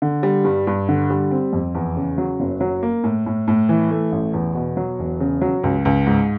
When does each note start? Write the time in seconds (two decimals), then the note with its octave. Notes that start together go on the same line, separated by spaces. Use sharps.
0.02 D3
0.23 G3
0.44 G2
0.67 G2
0.89 D3
1.10 G3
1.31 C4
1.53 F2
1.75 E2
1.97 C#3
2.18 F#3
2.40 F#1
2.61 F#3
2.83 A#3
3.04 A2
3.26 A2
3.48 A2
3.69 E3
3.90 A3
4.12 A1
4.33 E2
4.55 B2
4.77 F#3
4.99 E1
5.20 C#3
5.42 F#3
5.64 C#2
5.85 C#2
6.06 G#2